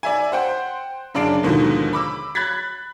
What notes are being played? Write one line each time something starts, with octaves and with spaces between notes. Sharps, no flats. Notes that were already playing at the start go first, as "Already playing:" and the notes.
D5 E5 G#5
C5 F#5 G5 C6
F#2 C#3 D4 D5 C7 D7
D#2 G#2 B2 D3 D#3 F3
B5 D6 E6
B5 F#6 G#6 A6 B6